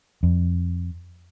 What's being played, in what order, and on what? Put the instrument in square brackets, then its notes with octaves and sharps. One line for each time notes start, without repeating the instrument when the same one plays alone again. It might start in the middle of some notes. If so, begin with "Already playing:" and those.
[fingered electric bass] F2